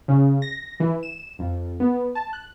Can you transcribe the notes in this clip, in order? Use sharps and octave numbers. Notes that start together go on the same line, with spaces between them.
C#3
A#6
E3
E7
F2
B3
A5
F#6